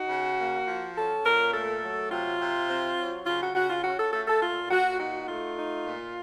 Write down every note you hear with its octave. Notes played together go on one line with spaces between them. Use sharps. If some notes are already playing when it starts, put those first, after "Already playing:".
Already playing: D#4 F#4
C#3
A#3
F3
C#4 A4
A#2 A#4
A3 A4
F#3
C3 F4
C3
C4
F#3
C#3 F4
F#4
C#3 F#4
F4
C#4 F#4
A4
A3 A4
A4
A#2 F4
A#2 F#4
D#4 F#4
A3 F4
D#4
A#2